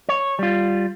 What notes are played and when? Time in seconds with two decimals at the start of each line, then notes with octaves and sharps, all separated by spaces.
0.09 C#5
0.39 G3 F4